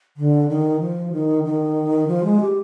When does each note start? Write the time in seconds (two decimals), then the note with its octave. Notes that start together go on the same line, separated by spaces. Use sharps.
0.17 D3
0.49 D#3
0.80 F3
1.13 D#3
1.44 D#3
2.08 F3
2.24 G#3
2.41 G4